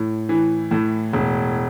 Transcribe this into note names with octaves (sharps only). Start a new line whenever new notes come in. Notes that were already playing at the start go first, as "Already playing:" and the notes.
Already playing: A2
E3
A2
E1